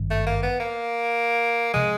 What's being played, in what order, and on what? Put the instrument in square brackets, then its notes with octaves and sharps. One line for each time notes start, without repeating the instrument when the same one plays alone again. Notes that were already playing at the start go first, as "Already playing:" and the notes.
Already playing: [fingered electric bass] G#1 G2 D#3
[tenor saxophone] A3
A#3
B3
A#3
[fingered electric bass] C3 F3 [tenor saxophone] G#3